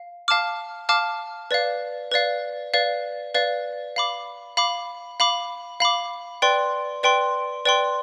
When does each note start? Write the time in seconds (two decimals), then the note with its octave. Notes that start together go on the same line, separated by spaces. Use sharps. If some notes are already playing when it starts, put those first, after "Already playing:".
Already playing: F5
0.28 F5 A5 D6 F6
0.89 F5 A5 D6 F6
1.51 B4 D5 F5
2.11 B4 D5 F5
2.74 B4 D5 F5
3.35 B4 D5 F5
3.96 F5 B5 D6
4.57 F5 B5 D6
5.20 F5 B5 D6
5.80 F5 B5 D6
6.42 B4 D5 G5 C6
7.03 B4 D5 G5 C6
7.65 B4 D5 G5 C6